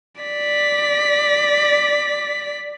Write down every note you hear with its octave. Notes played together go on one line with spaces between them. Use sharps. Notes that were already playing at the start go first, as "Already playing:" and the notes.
D5 B6